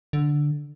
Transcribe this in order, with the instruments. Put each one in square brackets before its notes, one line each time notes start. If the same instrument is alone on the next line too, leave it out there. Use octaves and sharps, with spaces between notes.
[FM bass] D3